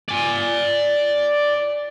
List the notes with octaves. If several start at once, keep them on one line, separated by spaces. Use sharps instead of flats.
D5 G#5